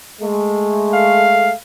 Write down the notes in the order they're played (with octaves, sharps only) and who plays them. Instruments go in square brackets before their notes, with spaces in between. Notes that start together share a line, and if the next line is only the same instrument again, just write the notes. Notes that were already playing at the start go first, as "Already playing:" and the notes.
[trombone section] G#3 A3
[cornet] F5